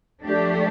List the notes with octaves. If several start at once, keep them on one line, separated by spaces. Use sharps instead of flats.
F3 A3 D4 G4